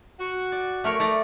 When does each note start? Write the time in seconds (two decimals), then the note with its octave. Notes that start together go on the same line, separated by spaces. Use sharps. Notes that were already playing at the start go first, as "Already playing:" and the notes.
0.19 F#4
0.52 D5
0.84 A3 A#4 C#5
1.00 A3 D5 A#5